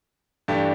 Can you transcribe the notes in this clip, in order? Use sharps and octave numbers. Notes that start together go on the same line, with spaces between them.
G2 E3 A3 D4 G4